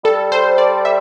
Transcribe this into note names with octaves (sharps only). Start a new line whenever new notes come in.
G3 A4
C5
D5
E5